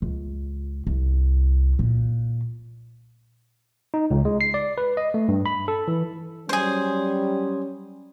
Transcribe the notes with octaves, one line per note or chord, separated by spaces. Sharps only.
C#2
C2
A#2
D#4
C#2
G#3
C7
D5
B4
D#5
A3
G2
B5
A4
E3
F#3 G3 C#4 G#4 C5